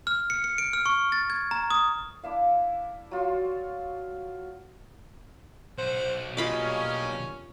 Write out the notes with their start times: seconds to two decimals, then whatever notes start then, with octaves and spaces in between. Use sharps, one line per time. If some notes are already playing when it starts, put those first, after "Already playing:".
0.07 F6
0.30 C#7
0.44 C#7
0.58 D7
0.73 F6
0.86 C#6
1.12 A6
1.30 G#6
1.51 A#5
1.70 D#6
2.24 D4 E4 E5 F5
3.11 F#3 F4 F#4 C6
5.78 B1 C5 F#5
6.37 G2 A#3 C#4 F4 D#5 B5 D6